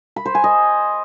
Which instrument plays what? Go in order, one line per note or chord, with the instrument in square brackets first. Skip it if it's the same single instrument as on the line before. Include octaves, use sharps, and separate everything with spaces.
[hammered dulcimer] B5
C5
G#5
D#5